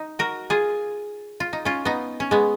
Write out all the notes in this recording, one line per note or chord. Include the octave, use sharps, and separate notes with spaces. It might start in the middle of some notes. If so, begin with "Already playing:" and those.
Already playing: D#4
F#4 A#4
F4 G#4
F4
D#4
C#4 F4
B3 D#4
C#4
G#3 B3